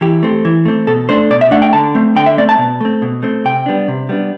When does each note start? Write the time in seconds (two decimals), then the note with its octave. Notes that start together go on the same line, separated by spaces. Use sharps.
0.01 E3 G4
0.23 A3 C4
0.45 E3
0.65 A3 C4
0.87 B2 A4
1.09 A3 D4 C5
1.30 B2 D5
1.41 E5
1.51 A3 D4 F#5
1.62 G5
1.73 D3 A5
1.95 A3 C4
2.16 D3 G5
2.26 E5
2.38 A3 C4 D5
2.49 A5
2.58 B2
2.81 A3 C4
3.02 B2
3.23 A3 C4
3.45 C3 G5
3.66 G3 B3 D4
3.88 C3
4.09 G3 B3 D4